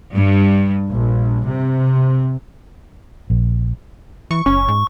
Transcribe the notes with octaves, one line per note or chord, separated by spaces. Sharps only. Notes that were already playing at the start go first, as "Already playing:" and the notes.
G2
A#1
C3
A#1
E3 C#6
F#1 C#4 C#6
G#2